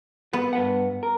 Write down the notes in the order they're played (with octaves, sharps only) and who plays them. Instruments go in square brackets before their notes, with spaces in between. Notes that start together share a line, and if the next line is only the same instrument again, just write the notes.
[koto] B3 [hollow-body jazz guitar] B4
[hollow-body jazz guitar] G2 B4 F#5
A#4